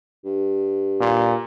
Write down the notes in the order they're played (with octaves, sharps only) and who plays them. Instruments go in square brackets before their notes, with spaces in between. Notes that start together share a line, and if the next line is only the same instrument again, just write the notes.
[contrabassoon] G2
[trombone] A#2